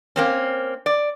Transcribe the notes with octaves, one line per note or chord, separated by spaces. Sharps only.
A#3 C4 C#4
D5